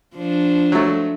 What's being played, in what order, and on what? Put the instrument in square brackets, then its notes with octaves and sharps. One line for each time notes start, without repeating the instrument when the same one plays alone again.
[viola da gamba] F3 D4 C5
[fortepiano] F#3 A3